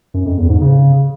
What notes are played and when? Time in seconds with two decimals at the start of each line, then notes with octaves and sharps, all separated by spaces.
0.14 F#2
0.26 F2
0.38 E2
0.49 G#2
0.61 C#3